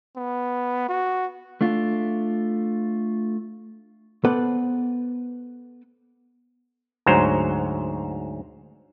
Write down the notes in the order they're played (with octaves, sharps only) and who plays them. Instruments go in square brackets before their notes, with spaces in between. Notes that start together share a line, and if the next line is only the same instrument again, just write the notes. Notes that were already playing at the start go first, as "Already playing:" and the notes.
[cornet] B3
F#4
[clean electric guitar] A3 D4 F4
[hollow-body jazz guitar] B3 A4 B4 C5 D5
[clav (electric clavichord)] D2 G#2 F#3 C5 A#5